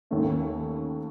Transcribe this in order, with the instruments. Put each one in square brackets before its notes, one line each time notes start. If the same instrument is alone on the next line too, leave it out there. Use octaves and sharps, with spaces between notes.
[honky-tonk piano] D#2 D#3 A3 C#4